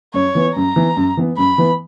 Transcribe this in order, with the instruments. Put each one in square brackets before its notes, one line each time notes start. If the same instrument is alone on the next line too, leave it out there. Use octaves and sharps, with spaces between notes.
[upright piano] F#2 [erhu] C#5
[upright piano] E3 B3
[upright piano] F#2 [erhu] A#5
[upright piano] E3 B3
F#2
E3 B3
[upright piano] F#2 [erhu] B5
[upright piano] E3 B3